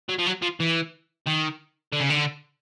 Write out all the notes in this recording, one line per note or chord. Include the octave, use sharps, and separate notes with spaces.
F#3
F3
F#3
F3
E3
D#3
D3
C#3
D3